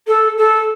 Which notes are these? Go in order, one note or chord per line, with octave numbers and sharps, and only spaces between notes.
A4
A4